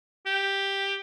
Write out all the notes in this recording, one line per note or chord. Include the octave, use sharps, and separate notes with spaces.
G4